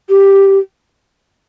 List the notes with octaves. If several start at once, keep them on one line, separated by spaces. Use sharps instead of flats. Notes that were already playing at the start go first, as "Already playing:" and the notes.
G4